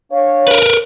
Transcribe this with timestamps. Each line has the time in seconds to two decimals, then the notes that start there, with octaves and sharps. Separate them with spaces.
0.12 D4 C#5 F5
0.48 A#4 B4